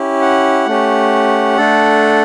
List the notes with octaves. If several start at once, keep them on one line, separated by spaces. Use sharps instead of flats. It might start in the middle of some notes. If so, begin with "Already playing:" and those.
Already playing: C#4 E4 G4
F#5
A3 C#4 G4
A3 D4 A4